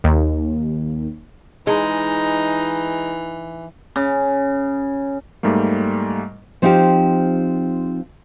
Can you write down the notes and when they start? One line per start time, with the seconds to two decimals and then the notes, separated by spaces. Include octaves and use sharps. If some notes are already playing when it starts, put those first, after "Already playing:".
0.04 D#2
1.67 E3 G#3 D#4
3.96 C#3
5.43 G#2 G3 A3 A#3
6.62 F3 C4 D#4 F4 G4